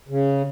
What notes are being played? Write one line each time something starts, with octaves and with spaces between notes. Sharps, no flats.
C#3